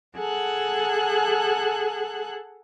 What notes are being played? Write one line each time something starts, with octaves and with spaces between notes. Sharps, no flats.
G#4 A4 F#5 F#6